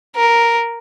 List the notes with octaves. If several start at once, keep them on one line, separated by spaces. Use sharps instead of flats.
A#4